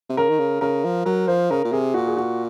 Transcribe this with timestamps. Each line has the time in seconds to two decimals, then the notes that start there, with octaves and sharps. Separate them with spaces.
0.09 C3
0.17 C#3 A#4
0.29 D#3
0.39 C#3
0.61 C#3 A#4
0.85 F3
1.06 F#3 A#4
1.28 F3 C5
1.51 C#3 A#4
1.65 A#2
1.72 C3 G#4
1.94 A#2 F#4
2.07 G#4
2.17 F#4